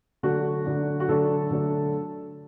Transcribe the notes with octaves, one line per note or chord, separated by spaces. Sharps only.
D3 F#3 A3 D4 F#4
D3 F#3 A3 D4
F#4
D3 F#3 A3 D4 A4
D3 F#3 A3 D4